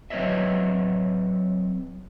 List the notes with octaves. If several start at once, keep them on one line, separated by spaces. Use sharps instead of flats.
F#3 C4 B4 C#5 D#5 E5